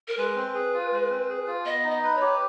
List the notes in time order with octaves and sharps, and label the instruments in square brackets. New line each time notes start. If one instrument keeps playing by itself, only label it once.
[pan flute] A#4
[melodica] G#3 [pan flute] B4
[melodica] C4
G#4
F4
G#3
C4
G#4
F4
[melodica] B3 [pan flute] D#5
[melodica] D#4
[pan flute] D#5
[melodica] B4
[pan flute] C#5
[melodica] G4